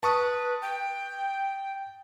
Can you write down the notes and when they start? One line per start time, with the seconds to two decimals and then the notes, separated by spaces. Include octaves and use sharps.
0.03 B4 A5 C#6 D#6
0.62 G5